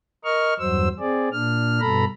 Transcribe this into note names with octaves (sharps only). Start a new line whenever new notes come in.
A#4 D#5 C#6 F6
E2 G2 F#3 C5 E6
C4 G#4 D5
A#2 D4 F6
G2 B2 A4 A#5 B5